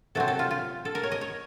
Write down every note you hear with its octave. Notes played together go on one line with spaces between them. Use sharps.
C3 F#3 C4 A4
A4
F4
F4
A4
A#4
C#5
D#5
C#5